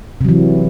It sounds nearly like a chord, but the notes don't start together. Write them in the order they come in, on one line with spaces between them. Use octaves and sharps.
C3 F#3 E3